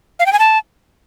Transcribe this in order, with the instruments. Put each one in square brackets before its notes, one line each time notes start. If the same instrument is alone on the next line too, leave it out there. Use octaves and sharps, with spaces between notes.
[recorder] F5
G5
G#5
A5